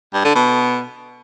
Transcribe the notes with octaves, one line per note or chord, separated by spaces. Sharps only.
G2
D3
B2